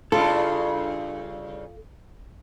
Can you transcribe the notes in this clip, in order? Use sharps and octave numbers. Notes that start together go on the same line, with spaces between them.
G2 C#3 E4 F4 A4